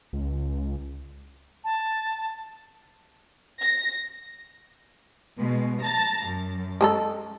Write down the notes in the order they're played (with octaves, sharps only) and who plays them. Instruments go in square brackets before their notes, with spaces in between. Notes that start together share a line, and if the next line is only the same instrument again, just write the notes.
[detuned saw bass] C#2
[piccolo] A5
[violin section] A#6
[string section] B2 G#3
A5 A#5 A6
F#2
[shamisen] G#3 G#4 A4